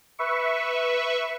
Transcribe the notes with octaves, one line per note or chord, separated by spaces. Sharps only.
B4 E5 C#6